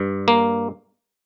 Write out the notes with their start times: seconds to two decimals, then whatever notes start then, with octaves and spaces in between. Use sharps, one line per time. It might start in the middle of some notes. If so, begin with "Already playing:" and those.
Already playing: G2
0.28 A#3